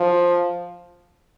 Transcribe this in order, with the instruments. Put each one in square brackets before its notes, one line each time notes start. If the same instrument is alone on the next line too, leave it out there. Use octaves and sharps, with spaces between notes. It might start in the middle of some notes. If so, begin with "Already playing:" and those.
Already playing: [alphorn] F3